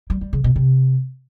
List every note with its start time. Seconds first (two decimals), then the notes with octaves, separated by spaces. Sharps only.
0.10 G3
0.21 G3
0.33 C#3
0.44 B2
0.56 C3